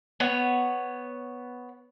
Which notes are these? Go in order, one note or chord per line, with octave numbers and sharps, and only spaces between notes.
B3 C#5